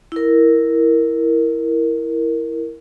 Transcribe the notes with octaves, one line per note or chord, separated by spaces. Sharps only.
E4 A#4